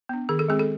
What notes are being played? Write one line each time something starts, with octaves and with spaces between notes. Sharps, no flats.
B3 D4
D#3 G#4
A4
G#3 C4 G#4
A4